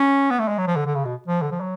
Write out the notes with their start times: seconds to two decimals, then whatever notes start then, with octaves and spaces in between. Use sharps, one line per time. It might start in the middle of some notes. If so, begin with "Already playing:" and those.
Already playing: C#4
0.30 B3
0.39 A3
0.48 G#3
0.58 F#3
0.67 F3
0.76 D3
0.86 D3
0.95 C#3
1.05 B2
1.28 F3
1.42 D3
1.51 F3
1.60 F#3